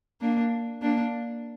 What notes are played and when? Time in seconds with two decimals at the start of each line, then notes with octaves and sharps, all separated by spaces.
0.21 A#3 D4
0.82 A#3 D4